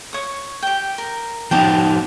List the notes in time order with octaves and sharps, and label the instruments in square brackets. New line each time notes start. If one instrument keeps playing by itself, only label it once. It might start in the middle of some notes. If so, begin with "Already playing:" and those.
[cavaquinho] C#5 D#6
G4 G5
A#4
[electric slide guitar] F3 B3 D#4 [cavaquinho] G5 A5 D6